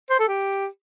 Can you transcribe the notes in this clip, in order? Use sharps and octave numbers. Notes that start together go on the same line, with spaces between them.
C5
A4
G4